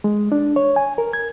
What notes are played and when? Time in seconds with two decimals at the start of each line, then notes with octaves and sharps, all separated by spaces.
0.04 G#3
0.32 D4
0.56 C#5
0.76 G#5
0.98 A#4
1.13 G#6